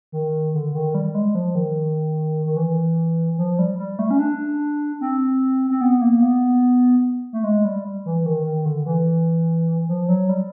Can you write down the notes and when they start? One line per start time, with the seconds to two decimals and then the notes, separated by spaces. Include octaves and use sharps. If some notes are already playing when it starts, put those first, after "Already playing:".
0.12 D#3
0.54 D3
0.75 D#3
0.94 G3
1.15 G#3
1.35 F3
1.55 D#3
2.46 D#3
2.56 E3
3.38 F3
3.59 G3
3.78 G3
3.99 A3
4.11 C#4
4.19 D4
5.01 C4
5.71 C4
5.81 B3
6.01 A#3
6.22 B3
7.33 A3
7.44 G#3
7.65 G3
8.05 E3
8.26 D#3
8.46 D#3
8.66 D3
8.86 E3
9.88 F3
10.08 F#3
10.29 G3